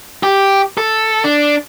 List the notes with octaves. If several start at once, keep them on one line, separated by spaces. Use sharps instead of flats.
G4
A4
D4